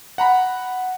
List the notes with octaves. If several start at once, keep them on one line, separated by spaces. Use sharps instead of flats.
F#5 A#5 B5